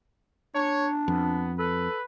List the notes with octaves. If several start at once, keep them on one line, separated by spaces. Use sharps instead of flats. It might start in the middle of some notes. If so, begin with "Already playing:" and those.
D4 C#5
F2 B3
A4 B4